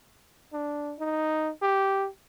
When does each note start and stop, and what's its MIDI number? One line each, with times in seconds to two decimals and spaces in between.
0.53 0.94 62
0.99 1.50 63
1.62 2.08 67